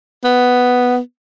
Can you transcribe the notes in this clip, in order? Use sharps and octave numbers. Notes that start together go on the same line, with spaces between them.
B3